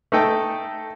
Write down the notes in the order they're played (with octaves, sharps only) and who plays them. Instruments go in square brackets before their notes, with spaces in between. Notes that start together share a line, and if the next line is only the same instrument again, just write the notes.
[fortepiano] A3 D#4 A4 G5